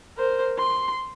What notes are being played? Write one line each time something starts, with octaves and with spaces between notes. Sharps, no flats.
A#4 C5
C6